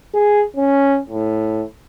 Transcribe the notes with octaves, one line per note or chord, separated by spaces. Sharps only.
G#4
C#4
A2